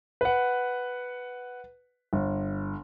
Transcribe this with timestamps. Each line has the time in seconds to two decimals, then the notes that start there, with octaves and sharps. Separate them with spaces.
0.21 B4 F#5
2.13 G1